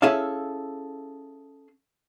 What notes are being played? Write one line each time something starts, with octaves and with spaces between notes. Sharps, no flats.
C#4 E4 G#4 A4 E5 F5